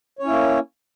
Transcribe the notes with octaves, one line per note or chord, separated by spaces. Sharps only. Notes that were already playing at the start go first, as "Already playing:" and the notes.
A#3 C#4 E4 C#5